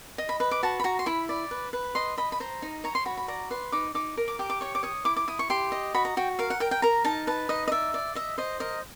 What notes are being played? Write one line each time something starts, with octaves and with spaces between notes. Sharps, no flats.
D#5
B5
B4 B5
D6
F#4 A5
B5
F#4 A#5
C6
E4 B5
D5
B4
B4
D#5 C6
D#5 B5
B5
C5 A#5
D#4
C#5 A#5
C6
F#4 B5
B5
D5 A#5
B4 C6
D#4 D6
D#4 D6
A#4
D6
G4 D6
D6
C#5 C#6
D6
C#5 D#6
E4 D6
D6
E4 D#6
C#6
G4 C6
D#5
F#4 B5
A#5
F#4 G5
A#4 F5
F#5
A#4 G5
G5
A#4 A#5
D#4 A5
B4 A5
D#4 D#5
D#5
D5 E5
D5
D#5 E5
C5 D#5
A#4 D#5